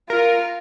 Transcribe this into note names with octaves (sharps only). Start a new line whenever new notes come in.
F4 A#4